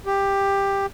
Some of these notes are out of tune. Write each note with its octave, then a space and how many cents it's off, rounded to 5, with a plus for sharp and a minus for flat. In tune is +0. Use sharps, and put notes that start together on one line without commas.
G4 +10